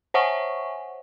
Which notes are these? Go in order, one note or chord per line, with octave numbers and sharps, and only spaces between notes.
C5 C#5 E5 F#5 G#5 C#6